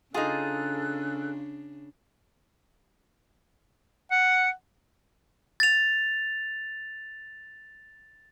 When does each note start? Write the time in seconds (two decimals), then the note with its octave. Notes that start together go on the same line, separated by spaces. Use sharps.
0.14 C#3 D4 D#4 F4 G#4 A4 E6 F#6
4.11 F#5 C#7
5.60 A6 F7